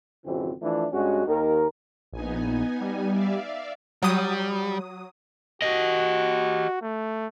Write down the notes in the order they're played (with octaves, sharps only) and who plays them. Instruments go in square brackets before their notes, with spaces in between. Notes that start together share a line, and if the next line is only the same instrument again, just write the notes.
[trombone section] G#1 F2 C#3 E3 C4 F#4
E3 F3 A3 D4
G2 G#3 C#4 F#4
D#2 D#3 A#4
[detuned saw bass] A#1 [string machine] B3 D#4 G#5
[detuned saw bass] G3
[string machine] D5 E5 F5
[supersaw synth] F#3 D#6 [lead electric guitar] G3
[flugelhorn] F#4 [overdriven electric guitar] G4 D#5
[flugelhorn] A3